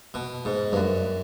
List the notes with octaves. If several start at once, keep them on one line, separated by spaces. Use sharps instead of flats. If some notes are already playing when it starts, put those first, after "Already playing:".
B2
G#2
G2
F#2